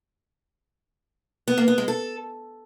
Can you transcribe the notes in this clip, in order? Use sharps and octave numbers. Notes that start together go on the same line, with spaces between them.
B3
A#3
B3
G#3
A4